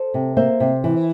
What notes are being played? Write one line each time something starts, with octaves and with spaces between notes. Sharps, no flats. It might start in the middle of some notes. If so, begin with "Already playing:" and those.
Already playing: A4 C5
C3
A#3 C5 E5
C3
E3